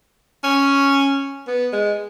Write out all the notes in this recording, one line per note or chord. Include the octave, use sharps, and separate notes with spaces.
C#4
B3
G#3